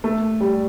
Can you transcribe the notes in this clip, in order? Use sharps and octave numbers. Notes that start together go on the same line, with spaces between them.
A3
G3